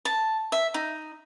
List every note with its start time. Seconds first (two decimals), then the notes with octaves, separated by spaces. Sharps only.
0.05 A5
0.52 E5
0.74 D#4